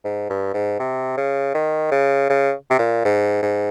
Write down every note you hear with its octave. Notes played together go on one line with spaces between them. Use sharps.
G#2
G2
G#2
C3
C#3
D#3
C#3
C#3
C3
A#2
G#2
G#2